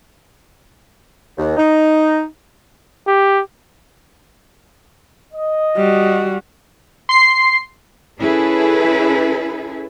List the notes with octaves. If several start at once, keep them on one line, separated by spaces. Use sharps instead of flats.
D#2
D#4
G4
D#5
G3 F#4
C6 C7
C#4 E4 G#4 A4 B4